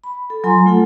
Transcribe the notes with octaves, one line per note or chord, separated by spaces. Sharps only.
B5
A4
F#3 F4 G#5 A#5 C6
A3 F4 A4 F#5